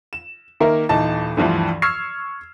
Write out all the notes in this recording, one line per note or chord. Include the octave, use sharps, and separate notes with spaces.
E7
D#3 A#3 A#4 E5
D#1 E3 D#4 A5 A6
D2 G2 E3 F3
C#6 E6 F6 G#6 C7